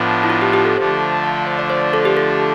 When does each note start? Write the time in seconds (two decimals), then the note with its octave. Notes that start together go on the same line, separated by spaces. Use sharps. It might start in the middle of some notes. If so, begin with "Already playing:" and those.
Already playing: A2 F3 B3 D4
0.24 E4
0.30 F4
0.42 G4
0.53 G4
0.65 A4
0.77 D3 F3 A3 D4 C5
1.24 F5
1.36 F5
1.46 C5
1.59 D5
1.70 C5
1.93 A4
2.05 G4
2.17 A4